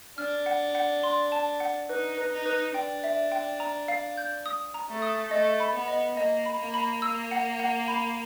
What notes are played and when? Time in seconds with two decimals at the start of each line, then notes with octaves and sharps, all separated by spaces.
0.18 D4 F6
0.46 F#5
0.75 F#5
1.03 C6
1.32 A5
1.60 F#5
1.89 D#4 B4
2.17 B4
2.32 D#4
2.46 B4
2.74 D4 G5
3.04 E5
3.32 G5
3.60 A#5
3.88 F5
4.17 G6
4.46 D#6
4.74 A#5
4.89 A3
5.02 D#6
5.31 A3 D#5
5.60 B5
5.74 B3
5.88 D#5
6.17 A#3 D#5
6.46 B5
6.60 A#3
6.74 B5
7.02 E6
7.31 F#5
7.59 F#5
7.88 B5